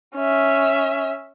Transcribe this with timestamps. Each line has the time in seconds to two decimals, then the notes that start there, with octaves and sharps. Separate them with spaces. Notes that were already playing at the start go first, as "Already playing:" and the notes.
0.16 C#4 E5